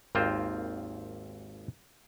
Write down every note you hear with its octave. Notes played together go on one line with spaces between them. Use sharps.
G#1 D#2 A#3 C4 F4 C5